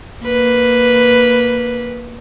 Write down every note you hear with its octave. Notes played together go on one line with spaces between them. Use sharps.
A#3 B4